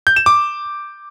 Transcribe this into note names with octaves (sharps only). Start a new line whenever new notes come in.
G6
E7
D6